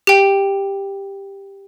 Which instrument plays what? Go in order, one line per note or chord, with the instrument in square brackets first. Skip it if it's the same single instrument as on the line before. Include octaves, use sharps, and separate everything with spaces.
[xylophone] G4 G5